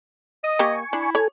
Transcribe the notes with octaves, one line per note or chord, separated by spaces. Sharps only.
D#5 D#6
A#3 G4 G#5 C#6
D4 E4
A4 C#5 G#5